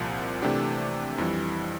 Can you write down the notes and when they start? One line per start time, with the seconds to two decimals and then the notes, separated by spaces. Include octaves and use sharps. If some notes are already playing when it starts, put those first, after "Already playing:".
Already playing: C2 A#2 F3
0.42 C3 E3 A3 D4 G4
1.18 F2 E3 G3